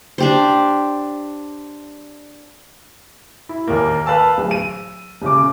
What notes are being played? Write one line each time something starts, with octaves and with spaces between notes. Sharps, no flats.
D4 G4 C5
E4
D#2 A#3
B4 F5 A5 E6
D1
D#7
D#1 C#3 D6